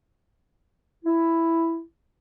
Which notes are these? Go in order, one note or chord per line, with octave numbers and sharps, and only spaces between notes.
E4